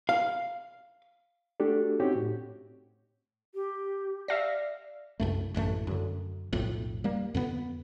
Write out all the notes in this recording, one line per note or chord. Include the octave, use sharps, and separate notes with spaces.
F5
A3 D4 F#4 G4 A4
C4 C#4 D#4 F#4 G4 C#5
A2
G4
D5 E5 F5 A#6
C2 F#2 A3
A1 F#2 G#3 A3
F#2 D3
B1 F2 A2
G3 A#3
F2 D3 B3